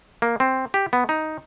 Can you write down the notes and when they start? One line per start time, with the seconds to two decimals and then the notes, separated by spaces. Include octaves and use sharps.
0.22 A#3
0.40 C4
0.74 G4
0.93 B3
1.09 D#4